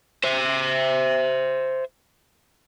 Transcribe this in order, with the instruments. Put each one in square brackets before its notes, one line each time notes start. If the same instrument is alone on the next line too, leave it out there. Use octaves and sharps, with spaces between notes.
[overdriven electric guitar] C5 E5